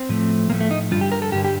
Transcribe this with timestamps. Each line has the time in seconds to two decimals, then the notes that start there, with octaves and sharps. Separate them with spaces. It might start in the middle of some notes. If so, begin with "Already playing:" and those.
Already playing: C4
0.09 A2 F3 A3
0.50 A2 F3 A3 A#3
0.61 A3
0.71 D#4
0.91 G2 D3 G3 F4
1.01 G4
1.12 A#4
1.22 A4
1.32 G2 D3 G3 G4
1.45 G4